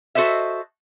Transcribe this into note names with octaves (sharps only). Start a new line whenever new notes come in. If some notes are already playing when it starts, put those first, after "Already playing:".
F#4 A4 C5 D#5 E5